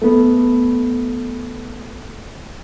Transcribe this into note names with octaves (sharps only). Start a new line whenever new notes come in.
A3 B3